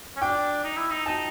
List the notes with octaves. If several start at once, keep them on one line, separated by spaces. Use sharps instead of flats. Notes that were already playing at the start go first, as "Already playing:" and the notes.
C#4
D4 G5
D#4
E4
D#4
D#4 A5